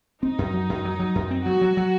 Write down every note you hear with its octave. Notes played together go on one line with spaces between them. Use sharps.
C4 D#4
F#2
F#3
F#2
F#3
F#3
F#2
C4
F#3 F#4
F#3
F#3